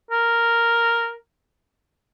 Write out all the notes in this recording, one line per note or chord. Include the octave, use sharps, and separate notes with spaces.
A#4